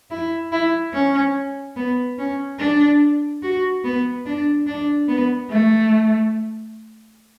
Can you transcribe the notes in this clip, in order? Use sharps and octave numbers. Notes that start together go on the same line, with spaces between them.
E4
E4
C#4
B3
C#4
D4
F#4
B3
D4
D4
B3
A3